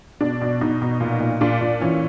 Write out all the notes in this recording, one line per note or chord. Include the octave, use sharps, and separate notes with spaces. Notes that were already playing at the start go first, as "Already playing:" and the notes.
B2 D4
B2
B2 D#4
B2
A#2
A#2
A#2 D4
A#2
E3 C#4